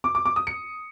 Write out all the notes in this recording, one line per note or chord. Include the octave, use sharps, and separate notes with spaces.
D6
D6
D6
D#6
C#7